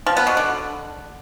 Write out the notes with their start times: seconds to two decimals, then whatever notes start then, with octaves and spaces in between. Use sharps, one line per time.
0.07 F3
0.17 B3
0.27 B2
0.37 D3